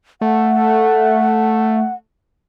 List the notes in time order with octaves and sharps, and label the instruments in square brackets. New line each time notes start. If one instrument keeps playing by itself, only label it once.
[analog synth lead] A3 [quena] F#5